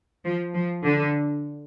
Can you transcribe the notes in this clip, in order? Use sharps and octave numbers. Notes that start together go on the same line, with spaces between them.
F3
F3
D3